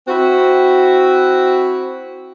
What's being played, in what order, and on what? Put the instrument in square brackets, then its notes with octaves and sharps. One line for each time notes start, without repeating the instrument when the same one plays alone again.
[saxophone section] C4 E4 F#4